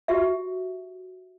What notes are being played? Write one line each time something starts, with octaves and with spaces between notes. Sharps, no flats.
F#4 G4 E5